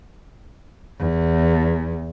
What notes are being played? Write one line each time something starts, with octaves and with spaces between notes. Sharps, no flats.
E2